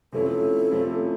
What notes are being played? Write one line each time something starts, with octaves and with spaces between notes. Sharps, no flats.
C3 F3 A3 C#4 E4 A4
C3 F3 A3 C#4 E4